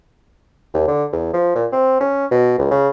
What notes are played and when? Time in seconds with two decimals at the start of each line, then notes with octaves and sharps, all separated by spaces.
0.74 D#2
0.88 D3
1.12 E2
1.33 F3
1.56 A#2
1.72 C4
2.01 C#4
2.31 B2
2.59 C#2
2.71 C#3